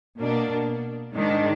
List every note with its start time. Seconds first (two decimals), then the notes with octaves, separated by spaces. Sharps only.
0.20 B2 A#3 D4
1.13 G#2 D#3 G#3 D4